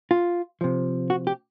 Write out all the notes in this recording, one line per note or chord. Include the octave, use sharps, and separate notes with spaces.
F4
C3 F3
F#4
G4